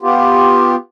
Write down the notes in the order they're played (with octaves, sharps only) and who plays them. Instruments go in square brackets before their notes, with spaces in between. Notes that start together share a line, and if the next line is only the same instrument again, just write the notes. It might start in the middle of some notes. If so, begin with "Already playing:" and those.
[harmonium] B3 F4 G4